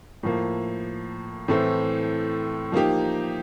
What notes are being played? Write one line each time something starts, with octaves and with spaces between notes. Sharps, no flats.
A2 F3 A#3
A2 E3 A3 C4
F3 A#3 D#4 G4